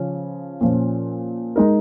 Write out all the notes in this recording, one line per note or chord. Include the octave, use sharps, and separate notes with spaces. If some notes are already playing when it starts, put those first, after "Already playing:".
Already playing: C#3 F3 C#4
A#2 F3 C#4
G#3 D#4 A#4